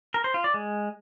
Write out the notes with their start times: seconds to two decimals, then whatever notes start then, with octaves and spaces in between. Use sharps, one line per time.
0.14 A#4
0.24 C5
0.34 F4
0.44 D5
0.54 G#3